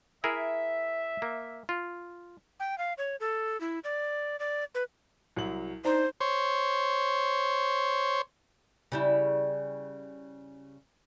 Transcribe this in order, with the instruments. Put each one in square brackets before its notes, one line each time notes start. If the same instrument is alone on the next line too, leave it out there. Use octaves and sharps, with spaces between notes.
[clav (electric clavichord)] E4 G#4 A#4 [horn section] E5
[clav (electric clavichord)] A#3
F4
[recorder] G5
F5
C#5
A4
E4
D5
D5
B4
[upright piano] C2 F#3 F#7
[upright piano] D4 A#5 [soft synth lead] D#4 [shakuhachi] C5
[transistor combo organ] C5 C#5
[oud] C#3 G3 E4